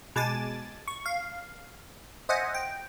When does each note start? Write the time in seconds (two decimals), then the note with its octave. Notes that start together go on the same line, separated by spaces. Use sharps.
0.16 B2 G#3 G#5 A5 D6 A6
0.88 C#6
1.06 F5
2.29 C5 D#5 E5 F#5 G#5
2.54 G5